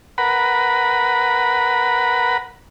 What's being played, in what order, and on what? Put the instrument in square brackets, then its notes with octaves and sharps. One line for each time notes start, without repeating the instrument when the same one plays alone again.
[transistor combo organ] A#4 B4 F#5 B5